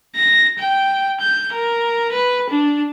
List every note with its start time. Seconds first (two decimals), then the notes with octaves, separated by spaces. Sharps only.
0.16 A#6
0.59 G5
1.20 G6
1.53 A#4
2.12 B4
2.50 D4